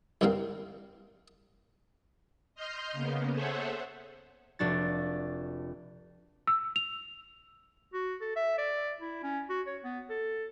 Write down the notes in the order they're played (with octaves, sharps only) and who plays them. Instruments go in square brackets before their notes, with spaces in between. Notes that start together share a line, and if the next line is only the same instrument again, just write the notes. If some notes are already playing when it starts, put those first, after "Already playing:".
[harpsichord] C2 G2 C3 A#3 C4 F5
[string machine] D#5 C6 F6 G6
C#3 A#3 B3
G#4 A4 C5 C#5 E5 F#5
[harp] F1 D4 F#4 A6
[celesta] E6
F7
[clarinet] F#4
A4
E5
D5
E4
C#4
F#4
C#5
B3
A4